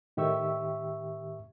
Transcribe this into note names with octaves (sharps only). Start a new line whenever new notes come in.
A2 D#3 G4 E5 C#6 E6